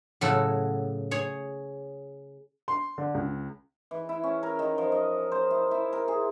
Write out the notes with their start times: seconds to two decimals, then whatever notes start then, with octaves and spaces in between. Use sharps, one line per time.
0.21 A2 C#3 F#3 F#4 A4
1.11 G#4 C#5
2.68 C6
2.98 D3
3.14 C#2
3.91 E3
4.09 E4
4.24 C#4
4.43 A#4
4.59 D#3
4.78 F3
4.92 D#5
5.32 C5
5.51 E4
5.71 E4
5.93 A#4
6.08 G#4